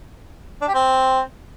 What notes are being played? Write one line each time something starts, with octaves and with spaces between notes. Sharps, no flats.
D4
G4
C4